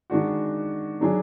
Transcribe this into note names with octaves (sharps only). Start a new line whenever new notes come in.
D#3 G#3 D4 F#4
D#3 F#3 D4 G#4